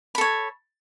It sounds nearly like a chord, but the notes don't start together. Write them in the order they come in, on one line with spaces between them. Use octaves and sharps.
B5 A4 C#5